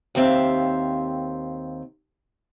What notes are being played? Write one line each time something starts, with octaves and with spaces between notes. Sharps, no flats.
D#2 D#3 C4 E5 F5